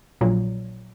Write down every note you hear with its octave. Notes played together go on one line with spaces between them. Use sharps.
A#1 A#2 F#3